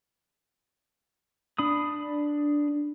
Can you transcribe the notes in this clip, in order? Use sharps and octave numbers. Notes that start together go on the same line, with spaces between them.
D4 B5 D#6